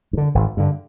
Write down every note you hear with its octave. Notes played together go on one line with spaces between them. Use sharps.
G2
D3
G#1
G2 D3